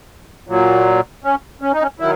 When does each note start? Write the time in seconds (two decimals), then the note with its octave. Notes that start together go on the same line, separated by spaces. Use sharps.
0.48 A#2 F#3
1.24 C#4
1.62 C#4
1.73 D#4
1.82 C#4
2.00 D#3 F#3 E4